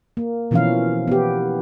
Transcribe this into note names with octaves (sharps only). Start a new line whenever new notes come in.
A#3
B2 E3 F3 C#4 E4 F5
B3 G4